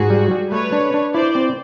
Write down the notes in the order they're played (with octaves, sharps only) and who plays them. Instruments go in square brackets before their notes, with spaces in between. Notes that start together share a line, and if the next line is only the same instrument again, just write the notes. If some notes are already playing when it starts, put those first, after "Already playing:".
Already playing: [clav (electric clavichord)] G#2 [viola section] F#4 G#4
[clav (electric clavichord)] G3
G3
[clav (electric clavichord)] A3 [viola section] B4 C#5
[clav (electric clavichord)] D4
D4
[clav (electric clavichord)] E4 [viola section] C5 D5
[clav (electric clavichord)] C4